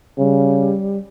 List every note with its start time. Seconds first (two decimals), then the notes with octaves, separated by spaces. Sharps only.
0.19 C#3 G3